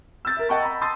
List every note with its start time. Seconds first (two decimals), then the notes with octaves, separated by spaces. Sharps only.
0.25 E6 G6 A6
0.37 A#4 E5
0.49 D#5 F#5 G5 A5 C#6
0.63 A#5 B5
0.81 A5 C6 D#6 E6 A6